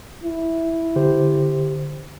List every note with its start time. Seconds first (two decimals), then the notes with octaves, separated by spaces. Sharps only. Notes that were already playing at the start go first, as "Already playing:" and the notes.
0.24 E4
0.96 D3 G4 C5